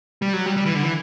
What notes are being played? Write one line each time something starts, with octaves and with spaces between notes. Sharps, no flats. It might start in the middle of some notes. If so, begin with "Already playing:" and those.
G3
F#3
G3
G3
E3
D3
E3